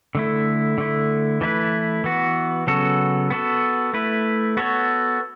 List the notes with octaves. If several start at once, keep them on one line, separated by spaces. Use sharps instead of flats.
D3 A3 E4
D3 A3 E4
E3 A3 E4 B4
E3 B3 F#4
C#3 F#3 B3 F#4 A4
B3 F#4 A4
A3 E4 B4
B3 F#4 A4 C#5